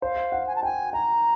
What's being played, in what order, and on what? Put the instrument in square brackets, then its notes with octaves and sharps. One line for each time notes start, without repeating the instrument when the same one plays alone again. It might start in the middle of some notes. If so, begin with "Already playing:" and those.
[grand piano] C5 [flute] F5
[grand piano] F#5
[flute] G#5
A5
[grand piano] G5 [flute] G#5
[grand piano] G#5 [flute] A#5